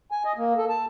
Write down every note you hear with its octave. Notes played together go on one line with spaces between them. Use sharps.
G#5
D#5
A#3
A4
A5